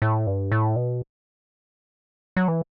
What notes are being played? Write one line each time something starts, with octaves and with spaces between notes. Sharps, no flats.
A2
G2
A2
B2
F#3
E3